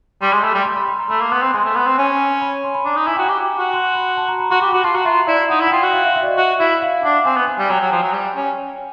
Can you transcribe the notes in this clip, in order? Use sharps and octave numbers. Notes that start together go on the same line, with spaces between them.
G3 C6
G#3
A3 B5
G3
C6
B5
B5
A#5
A3 B5
A#3
B3 C6
C4
B5
G#3 C6
A3
B3 B5
C4
C#4
B5
C6
B5
D4 A#5
D#4
E4 G#5
F#4 G5
G4 G#5
F#4
C6
B5
A5
A#5
B5
F#4 C6
G4 B5
F#4 B5
F4 A5
F#4 A#5
F4 E5
E4 D5
D#4 F#5
E4
F#5
F4 G5
F#4
F5
E5
E5
D5
D#5
F#4 E5
E4 E5
F5
D4 F#5
C4 G#5
B3
G#5
G3
F#3 G5
F#3
F3
F#3
G3
C#4